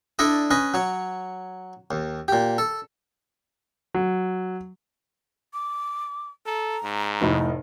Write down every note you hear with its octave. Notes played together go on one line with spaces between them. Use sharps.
D4 E4 A4 D5 D#5
C#4 B4 D#5
F#3 C#5
D#2
A#2 G4
A4
F#3
D6
A4 A#5
G#2
F1 A2 D#4